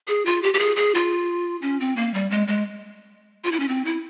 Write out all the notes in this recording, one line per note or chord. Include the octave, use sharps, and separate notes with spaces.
G#4
F4
G4
G4
G#4
G#4
F4
C#4
C4
A#3
G3
G#3
G#3
F4
E4
C#4
C4
E4